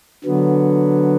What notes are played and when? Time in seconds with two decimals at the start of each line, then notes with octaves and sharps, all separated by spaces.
0.24 D3 F#3 B3